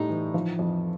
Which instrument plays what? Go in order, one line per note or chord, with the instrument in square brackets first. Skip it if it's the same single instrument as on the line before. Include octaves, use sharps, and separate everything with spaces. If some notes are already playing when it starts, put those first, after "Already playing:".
Already playing: [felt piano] A2 G3 [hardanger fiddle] D#4
[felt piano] E3
F3
F2